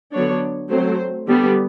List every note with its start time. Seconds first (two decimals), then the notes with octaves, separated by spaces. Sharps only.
0.13 D3 F#3 B3 D4 C#5
0.70 F#3 A3 C4 C5
1.27 D3 G3 B3